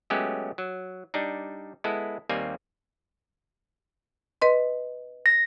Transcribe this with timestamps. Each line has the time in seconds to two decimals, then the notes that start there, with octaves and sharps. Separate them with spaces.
0.10 F#3 G#3 A3 B3 C#4 G4
0.58 F#3
1.14 G3 D4 D#4
1.84 G#3 B3 E4 A4
2.29 D#2 G3 A#3 C4 G#5
4.42 B4 D#5 C6
5.26 A#6